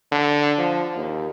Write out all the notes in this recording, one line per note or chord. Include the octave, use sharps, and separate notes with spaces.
D3
F3
D#2